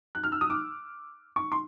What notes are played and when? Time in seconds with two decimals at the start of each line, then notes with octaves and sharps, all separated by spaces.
0.15 F#6
0.24 F6
0.32 E6
0.41 D#6
0.50 D6
1.36 C#6
1.52 C6